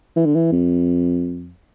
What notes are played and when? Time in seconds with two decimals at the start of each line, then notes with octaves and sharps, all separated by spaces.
0.17 E3
0.25 D3
0.35 E3
0.52 F2